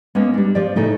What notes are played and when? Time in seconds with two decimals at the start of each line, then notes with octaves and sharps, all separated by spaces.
0.15 G#3 A#3 B3 C#4
0.34 G3 D4
0.55 F3 D5
0.76 A2 C#3 A3 D#4 E4